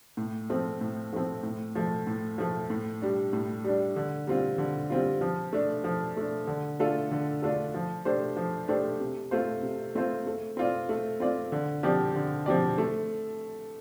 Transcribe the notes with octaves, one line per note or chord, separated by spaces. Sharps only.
A2
F3 A3 C4
A2
F3 A3 C4
A2
F3 A3
A2
F3 A3
A2
G3 D4
A2
G3 D4
D3
G3 C4 F4
D3
G3 C4 F4
F3
A3 D4
F3
A3 D4
D3
A3 D4 F4 A4
D3
A3 D4 F4 A4
F3
A3 D4 G4 C5
F3
A3 D4 G4 C5
C3
A3 C4 F4 C5
C3
A3 C4 F4 C5
A3
C4 F4 D5
A3
C4 F4 D5
D3
F3 C4 G4 D5
D3
F3 C4 G4 D5
A3